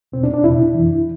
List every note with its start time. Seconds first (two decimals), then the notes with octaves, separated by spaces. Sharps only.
0.12 E2 B2 C4
0.23 D4
0.34 D4
0.44 E2 B2 E4
0.75 F2 E3